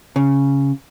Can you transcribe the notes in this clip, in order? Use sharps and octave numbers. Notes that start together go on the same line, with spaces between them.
C#3